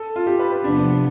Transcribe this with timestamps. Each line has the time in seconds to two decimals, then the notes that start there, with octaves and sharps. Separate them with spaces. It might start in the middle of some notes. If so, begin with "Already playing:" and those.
Already playing: A4
0.16 F4
0.26 G4
0.39 B4
0.52 B4
0.64 E2 C3 F3 B3 D4